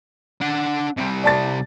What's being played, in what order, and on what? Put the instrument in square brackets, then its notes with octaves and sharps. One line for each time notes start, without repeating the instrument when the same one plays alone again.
[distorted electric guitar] D4 F#5
C3 G3
[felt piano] D5 A5 A6